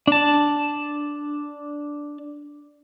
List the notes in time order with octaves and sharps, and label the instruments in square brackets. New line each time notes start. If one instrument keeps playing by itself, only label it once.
[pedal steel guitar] D4 A5